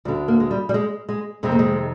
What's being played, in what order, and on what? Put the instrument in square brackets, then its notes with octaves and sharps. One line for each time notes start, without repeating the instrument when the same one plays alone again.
[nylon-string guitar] D2 G3
D3
A#3
G#3
G3
G3
G#3
G#3
F2 C3 D#3 G#3
A#3
G#3